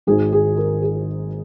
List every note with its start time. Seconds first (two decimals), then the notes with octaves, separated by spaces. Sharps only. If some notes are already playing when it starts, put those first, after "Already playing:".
0.07 G#1 G#2 D#3 G#4
0.33 G#4
0.57 A#4
0.83 G#4